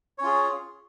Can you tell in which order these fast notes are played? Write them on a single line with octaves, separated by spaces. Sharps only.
C#5 C#4 F4 G#4